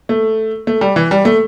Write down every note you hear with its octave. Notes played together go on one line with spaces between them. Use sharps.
A3
A3
G3
E3
G3
A3